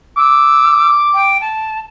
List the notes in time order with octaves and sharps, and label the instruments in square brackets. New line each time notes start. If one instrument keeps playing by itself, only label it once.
[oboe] D6 [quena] E6
[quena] G5
A5